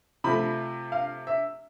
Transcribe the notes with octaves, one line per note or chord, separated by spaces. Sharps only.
C3 F3 A3 B5
F5
E5